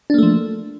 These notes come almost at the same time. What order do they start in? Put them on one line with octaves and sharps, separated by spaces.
D4 A#3 A3 F3